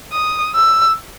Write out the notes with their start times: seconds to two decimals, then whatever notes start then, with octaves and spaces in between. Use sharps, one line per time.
0.12 D#6
0.55 E6